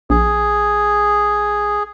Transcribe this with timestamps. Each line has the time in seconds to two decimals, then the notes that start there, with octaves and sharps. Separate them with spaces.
0.10 A#1 G#4